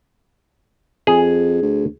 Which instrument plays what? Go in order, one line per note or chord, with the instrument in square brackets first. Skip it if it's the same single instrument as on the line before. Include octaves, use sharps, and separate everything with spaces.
[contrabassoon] F2 [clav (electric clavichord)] G#4
[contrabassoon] D2